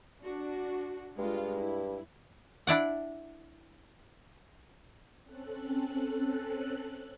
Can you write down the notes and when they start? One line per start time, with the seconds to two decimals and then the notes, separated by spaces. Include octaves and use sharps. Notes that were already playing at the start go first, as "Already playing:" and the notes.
0.22 D4 F#4
1.18 G2 G#3 F4
1.58 E4
2.67 D4 E4 D5 F#5
5.23 C4 C#4 A4 F#6